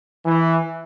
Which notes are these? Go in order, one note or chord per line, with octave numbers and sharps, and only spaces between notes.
E3